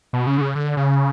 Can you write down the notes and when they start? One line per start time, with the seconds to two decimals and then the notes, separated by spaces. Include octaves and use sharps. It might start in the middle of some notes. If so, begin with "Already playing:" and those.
0.13 B2
0.27 C#3
0.38 D3
0.41 C#3
0.55 D3
0.77 C#3